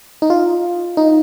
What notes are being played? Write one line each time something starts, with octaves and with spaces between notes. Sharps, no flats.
D#4
F4
D#4